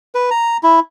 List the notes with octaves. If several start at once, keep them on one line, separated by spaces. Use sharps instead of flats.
B4
A#5
E4